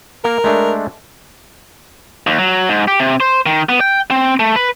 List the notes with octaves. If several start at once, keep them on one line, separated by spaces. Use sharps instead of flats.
A#3 A#4
G#3 A3 D4
D#2
F#3
G#2
G4
C3
C5
D#3
B3
G5
C4
A3
B4